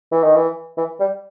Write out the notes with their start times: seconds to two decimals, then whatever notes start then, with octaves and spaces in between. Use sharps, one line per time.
0.12 E3
0.24 D#3
0.36 E3
0.77 E3
1.00 G3